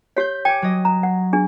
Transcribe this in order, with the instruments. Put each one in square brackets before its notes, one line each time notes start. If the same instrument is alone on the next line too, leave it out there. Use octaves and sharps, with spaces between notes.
[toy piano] G4 C#5 [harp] G6 B6
[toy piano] G5 [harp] G#5 D6
[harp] F#3 D#5
[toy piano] A#5
F#5
D4 G#4